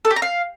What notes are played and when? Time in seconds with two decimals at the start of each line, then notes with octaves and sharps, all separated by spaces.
0.05 A4
0.11 G4
0.16 A#5
0.22 F5